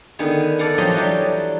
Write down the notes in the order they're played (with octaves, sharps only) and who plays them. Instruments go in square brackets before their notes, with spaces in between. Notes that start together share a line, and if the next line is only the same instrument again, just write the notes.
[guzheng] D3 D#3 B3 G#4
A4 D5 F5 F#5 G#5
F3 F#3 G4 B4 D#5 C6
E3 F#3 G3